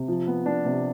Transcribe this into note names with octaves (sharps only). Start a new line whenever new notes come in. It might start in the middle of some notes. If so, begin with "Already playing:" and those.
Already playing: C3
F3
B3
D4
C3